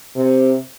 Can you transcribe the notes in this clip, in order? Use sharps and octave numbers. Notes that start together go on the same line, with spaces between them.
C3